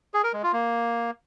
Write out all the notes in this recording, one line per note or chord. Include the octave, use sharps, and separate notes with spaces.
G#4
A#4
G#3
F4
A#3